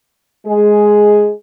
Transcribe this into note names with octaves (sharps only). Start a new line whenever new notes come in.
G#3 G#4